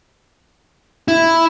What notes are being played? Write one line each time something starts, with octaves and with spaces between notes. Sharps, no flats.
E4